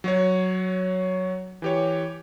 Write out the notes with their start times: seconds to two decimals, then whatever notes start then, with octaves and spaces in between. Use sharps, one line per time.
0.04 F#3 F#4 C#5
1.62 E3 G4 C#5